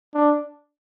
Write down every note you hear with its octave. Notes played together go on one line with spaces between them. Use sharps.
D4